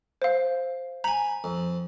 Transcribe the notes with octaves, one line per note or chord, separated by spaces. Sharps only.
C5 F5
G#5 A#5 B5
F2